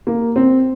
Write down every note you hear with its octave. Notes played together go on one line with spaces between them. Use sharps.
A#3
C4